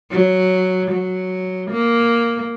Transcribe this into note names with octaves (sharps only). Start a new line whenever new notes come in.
F#3
F#3
A#3